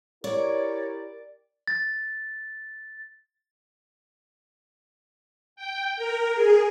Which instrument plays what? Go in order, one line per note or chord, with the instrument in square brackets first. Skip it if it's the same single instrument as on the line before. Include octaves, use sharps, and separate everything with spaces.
[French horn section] E4 G4 A#4 [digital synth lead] C#5 [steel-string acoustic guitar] D5
[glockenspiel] A6
[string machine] G5
A#4
G#4